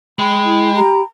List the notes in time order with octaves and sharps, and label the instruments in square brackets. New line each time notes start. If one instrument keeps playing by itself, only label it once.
[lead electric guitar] G#3 [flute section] G5 B5
[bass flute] E4
[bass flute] G4 [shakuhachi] A#5